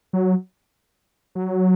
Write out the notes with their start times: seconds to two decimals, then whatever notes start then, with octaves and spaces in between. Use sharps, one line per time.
0.13 F#3
1.35 F#3